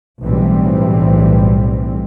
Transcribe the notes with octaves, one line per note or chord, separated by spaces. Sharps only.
B1 A2 E3 G3 C4